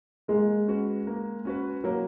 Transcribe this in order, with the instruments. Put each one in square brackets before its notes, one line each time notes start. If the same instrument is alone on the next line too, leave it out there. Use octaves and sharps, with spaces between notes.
[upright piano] G#3 [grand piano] A#3
[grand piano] C#4 F#4 B4
A#3
C#4 F#4 B4
[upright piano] F#3 [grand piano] A#3